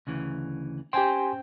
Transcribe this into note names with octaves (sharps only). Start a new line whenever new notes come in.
D2 C#3 E3
C#4 G4 C5 G5 G#5 C6